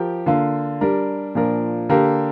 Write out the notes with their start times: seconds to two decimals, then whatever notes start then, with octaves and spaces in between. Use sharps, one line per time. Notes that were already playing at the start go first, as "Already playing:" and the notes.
Already playing: F3 G4 A#4
0.26 D3 A#3 F4
0.81 G3 D4 A#4
1.35 A#2 F3 D4 A#4
1.89 D3 A#3 G4 A#4